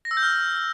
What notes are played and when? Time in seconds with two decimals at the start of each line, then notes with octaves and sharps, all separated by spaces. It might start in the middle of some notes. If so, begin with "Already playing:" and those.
0.05 A#6
0.11 E6
0.17 G6
0.23 F6